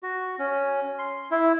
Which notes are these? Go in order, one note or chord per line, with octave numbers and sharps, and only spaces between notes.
F#4
C#4
C6
E4